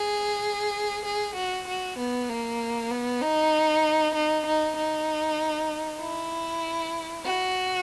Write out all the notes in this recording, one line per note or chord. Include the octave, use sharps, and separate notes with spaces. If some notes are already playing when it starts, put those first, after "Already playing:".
Already playing: G#4
G#4
F#4
F#4
B3
A#3
B3
D#4
D#4
D#4
D#4
E4
F#4